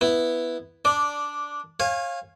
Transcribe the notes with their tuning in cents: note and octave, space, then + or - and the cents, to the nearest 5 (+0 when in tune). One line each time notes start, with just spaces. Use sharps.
B3 +0 E4 +0
D4 -10 D5 +0
C#5 -35 F5 +0 G#5 -15